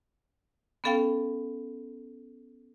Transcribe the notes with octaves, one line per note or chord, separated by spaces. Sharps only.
B3 C#4 A4 F5 G5